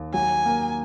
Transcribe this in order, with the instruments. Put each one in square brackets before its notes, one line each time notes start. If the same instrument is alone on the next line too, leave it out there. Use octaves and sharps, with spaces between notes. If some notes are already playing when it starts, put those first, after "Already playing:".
Already playing: [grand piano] D#2
[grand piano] F#3 [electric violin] G#5
[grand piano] A#3